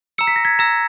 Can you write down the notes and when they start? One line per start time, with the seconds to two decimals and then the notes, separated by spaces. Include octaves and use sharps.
0.18 A#5 E6 C#7
0.27 B6
0.36 A#6
0.45 G#6 B6
0.59 A#5 E6 A#6